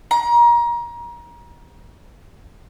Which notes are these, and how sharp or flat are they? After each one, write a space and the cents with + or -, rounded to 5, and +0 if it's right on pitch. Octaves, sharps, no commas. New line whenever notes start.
A#5 +30